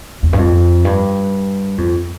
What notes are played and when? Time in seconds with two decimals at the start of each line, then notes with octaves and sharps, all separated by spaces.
0.23 E2
0.33 G2
0.39 F2
0.85 G2
1.78 F2